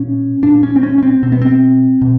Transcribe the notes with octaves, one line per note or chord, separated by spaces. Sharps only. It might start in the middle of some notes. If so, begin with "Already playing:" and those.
Already playing: A#2 C#4
A#2 D4
C#4
C4
C#4
C#4
C4
B2 C4
B3
C4
B2